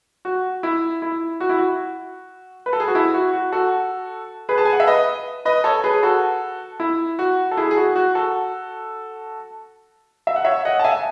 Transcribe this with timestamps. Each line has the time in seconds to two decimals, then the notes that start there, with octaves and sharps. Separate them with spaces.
0.25 F#4
0.63 E4
1.02 E4
1.40 F#4
1.49 E4
1.59 F#4
2.66 B4
2.73 A4
2.80 G#4
2.88 F#4
2.95 E4
3.14 F#4
3.33 F#4
3.52 F#4 A4
4.49 G#4 B4
4.58 A5
4.65 G#5
4.73 F#5
4.80 E5
4.88 B4 D#5
5.45 B4 D#5
5.64 A4 C#5
5.84 G#4 B4
6.03 F#4 A4
6.80 E4
7.19 F#4
7.51 A4
7.57 E4 G#4
7.71 G#4
7.77 F#4
7.96 F#4
8.15 F#4 A4
10.27 E5
10.36 F#5
10.45 C#5 E5
10.65 D#5 F#5
10.79 A5
10.84 E5 G#5